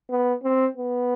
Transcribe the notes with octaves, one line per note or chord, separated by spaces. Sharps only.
B3
C4
B3